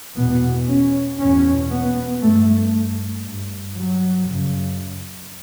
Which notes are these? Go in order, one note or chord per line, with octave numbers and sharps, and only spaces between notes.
E2 B2 B3
C#4
E2 B2 C#4
B3
G2 A3
G2
F#3
F#2 C#3